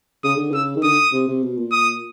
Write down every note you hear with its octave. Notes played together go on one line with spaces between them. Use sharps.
C#3 D#6
D3
C#3 E6
D#3
D3 D#6
C3
C3
B2
A#2
D#6